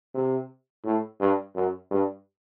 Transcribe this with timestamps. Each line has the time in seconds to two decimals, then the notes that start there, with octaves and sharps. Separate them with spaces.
0.15 C3
0.85 A2
1.20 G2
1.55 F#2
1.91 G2